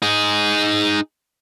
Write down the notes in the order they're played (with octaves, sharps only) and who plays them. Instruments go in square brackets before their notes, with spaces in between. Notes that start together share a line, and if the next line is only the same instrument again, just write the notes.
[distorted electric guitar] D#4 G#4